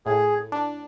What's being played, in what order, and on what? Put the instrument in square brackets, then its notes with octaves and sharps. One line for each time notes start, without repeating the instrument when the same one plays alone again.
[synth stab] A2 [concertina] G#4
[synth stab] D4